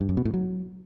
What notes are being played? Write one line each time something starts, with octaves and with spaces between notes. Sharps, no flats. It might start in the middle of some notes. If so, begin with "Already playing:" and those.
G2
F#2
B2
A2
F#3